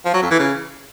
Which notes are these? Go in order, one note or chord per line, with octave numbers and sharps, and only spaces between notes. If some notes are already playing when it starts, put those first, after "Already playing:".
F3
F#3
F2
E3
C#3